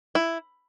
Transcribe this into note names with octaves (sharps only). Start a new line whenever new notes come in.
E4